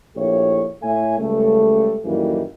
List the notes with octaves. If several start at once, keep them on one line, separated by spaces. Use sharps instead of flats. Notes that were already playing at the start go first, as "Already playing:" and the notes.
A#1 A3 E4 G4 C#5
A2 A3 C#5 E5 G#5
C#2 C#3 G3 A3
F#2 A2 D#3 E3 G3 A#3